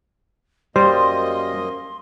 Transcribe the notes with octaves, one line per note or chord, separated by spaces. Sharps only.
F#2 G3 A#3 C5 D#5 C6